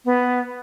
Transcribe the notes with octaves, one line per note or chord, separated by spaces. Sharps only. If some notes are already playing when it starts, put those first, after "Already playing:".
B3